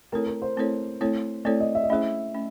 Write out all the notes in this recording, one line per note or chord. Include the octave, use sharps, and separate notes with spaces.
A3 C4 E4 A4 A#4 C#5
A#4
C5
A3 C4 E4 A4 C#5
A3 C4 E4 A4 C#5
A3 C4 E4 A4 C#5 D5
D#5
E5
D#5
A3 C#4 E4 G#4 C5 E5
A3 C#4